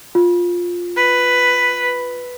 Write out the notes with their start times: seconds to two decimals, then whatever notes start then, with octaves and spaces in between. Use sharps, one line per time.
0.15 F4
0.97 B4